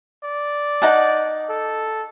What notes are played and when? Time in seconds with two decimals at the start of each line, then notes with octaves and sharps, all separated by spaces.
0.24 D5
0.82 D#4 F#5 A5
1.49 A4